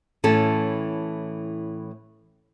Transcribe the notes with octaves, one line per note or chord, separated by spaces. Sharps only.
A2 E3 C#4 A4